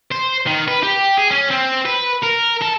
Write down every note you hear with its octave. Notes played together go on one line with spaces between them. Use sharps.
C5
D#3
B4
G4
G#4
C#4
C4
B4
A#4
A4